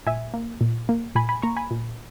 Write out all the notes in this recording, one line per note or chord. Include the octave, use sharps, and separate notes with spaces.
A#2 E5 G#5
A#3
A#2
A#3
A#2 G#5 B5
G#5 B5
A#3 A#5 C#6
G#5 B5
A#2